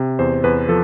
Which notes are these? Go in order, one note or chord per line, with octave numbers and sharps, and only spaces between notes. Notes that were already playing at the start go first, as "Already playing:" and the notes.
Already playing: C3
E2 C5
E2 B4
F3 A4